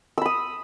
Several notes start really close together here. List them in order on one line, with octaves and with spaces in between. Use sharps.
E6 B5 D#6